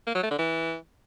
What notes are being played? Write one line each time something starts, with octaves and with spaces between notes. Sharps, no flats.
A#3
F#3
A3
D3
E3